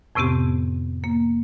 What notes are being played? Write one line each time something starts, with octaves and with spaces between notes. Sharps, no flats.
F2 A2 C3 B3 C4 G4
A#3